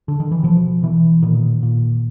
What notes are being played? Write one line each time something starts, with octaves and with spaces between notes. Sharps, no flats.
D3
D#3
E3
B2 F3
B2 E3
A#2 D#3
A#2